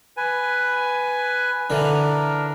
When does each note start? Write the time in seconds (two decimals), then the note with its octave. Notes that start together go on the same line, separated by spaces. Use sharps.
0.17 B4 G#5
1.70 D3 E3 D4 A#4